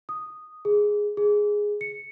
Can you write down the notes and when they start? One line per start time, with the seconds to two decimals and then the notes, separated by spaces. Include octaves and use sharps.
0.09 D#6
0.65 G#4
1.17 G#4
1.81 C#7